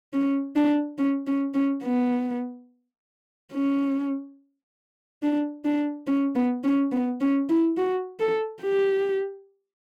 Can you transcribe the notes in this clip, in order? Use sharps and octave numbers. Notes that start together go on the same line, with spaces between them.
C#4
D4
C#4
C#4
C#4
B3
C#4
D4
D4
C#4
B3
C#4
B3
C#4
E4
F#4
A4
G4